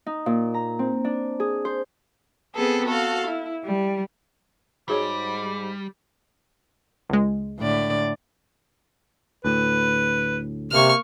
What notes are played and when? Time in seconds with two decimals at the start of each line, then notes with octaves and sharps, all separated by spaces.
0.06 D#4
0.26 A#2
0.54 A#5
0.79 C4
1.05 D4
1.40 G#4
1.65 C5
2.55 B3 C4 G#4 A4 B4
2.86 F#4 A4 F5
3.26 E4
3.64 G3
4.89 G#2 G3 F#4 G#4 C#5 D6
7.09 C#2 G#3
7.60 A2 D3 D5
9.45 D2 A2 B4
10.72 C3 A#3 C#6 F6